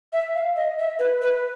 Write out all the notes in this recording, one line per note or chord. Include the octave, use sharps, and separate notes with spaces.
E5
F5
D#5
E5
B4
B4